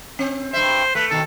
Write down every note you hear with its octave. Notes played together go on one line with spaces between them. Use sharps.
C4
G2 C5 E5
A3 B4
B2 D#3 A4